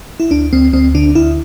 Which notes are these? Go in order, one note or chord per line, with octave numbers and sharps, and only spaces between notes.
E4
D2 D4
D2 C4
D2 C4
D3 D4
D2 E4